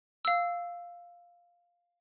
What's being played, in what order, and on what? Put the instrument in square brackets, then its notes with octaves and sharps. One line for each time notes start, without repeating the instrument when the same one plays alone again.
[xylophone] F5 E6